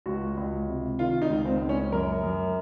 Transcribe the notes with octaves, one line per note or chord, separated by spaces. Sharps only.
C#2 F#4
C#2
C3
D#3 F4
D#4
C#2
C4
C#2
C#4
F#2 A#4
F#2